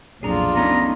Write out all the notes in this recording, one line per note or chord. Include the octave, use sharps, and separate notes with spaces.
B1 F2 A#2 D4 F4 G#4 A#5
A3 B3 C#4 D#4 A#5